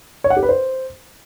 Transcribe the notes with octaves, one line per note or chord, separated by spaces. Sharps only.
C#5
F#5
G4
B4
C5